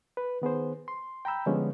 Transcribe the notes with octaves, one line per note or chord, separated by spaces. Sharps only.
B4
D#3 B3 G#4 C5
C6
G5 A#5 B5 E6 G6
D3 F3 G3 G#3 B3 C#4